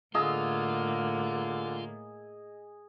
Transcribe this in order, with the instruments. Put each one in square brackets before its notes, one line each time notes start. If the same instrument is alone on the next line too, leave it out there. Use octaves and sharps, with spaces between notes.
[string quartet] A2 A#3 [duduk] D3 [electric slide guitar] F4 [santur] G#4 D#5 E6